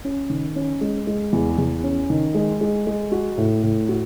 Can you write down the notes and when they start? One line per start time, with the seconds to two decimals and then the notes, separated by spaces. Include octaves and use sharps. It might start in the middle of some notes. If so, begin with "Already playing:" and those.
0.05 C#4
0.30 D#3
0.56 C#4
0.81 G#3
1.07 G#3
1.33 E2
1.58 E2
1.84 C#4
2.10 D#3
2.35 G#3
2.61 G#3
2.87 G#3
3.12 F#4
3.37 A2
3.63 A2
3.89 F#4